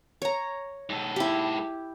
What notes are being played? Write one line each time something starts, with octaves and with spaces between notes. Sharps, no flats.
C#5 A#5
G#2 A4
E4 G4